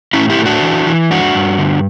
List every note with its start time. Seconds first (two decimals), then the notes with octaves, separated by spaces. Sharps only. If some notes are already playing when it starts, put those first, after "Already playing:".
0.13 A2 C#4 E4
0.30 E4 G4
0.38 A2
0.46 D4 F#4
0.63 E3
0.86 E3
1.10 G2 D4 F#4
1.35 G2
1.58 D3